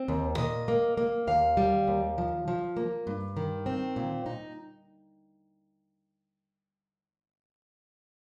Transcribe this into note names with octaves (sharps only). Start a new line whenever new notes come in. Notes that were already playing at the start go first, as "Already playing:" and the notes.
Already playing: C4
D#2
A#2 D#5
A#3
A#3
D#2 F5
G3
D#2
F3
F3
A#3
G2
D#3
C4
A#2
D#4